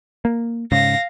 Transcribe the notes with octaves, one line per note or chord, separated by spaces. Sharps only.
A#3
G#2 C#3 F5 A#6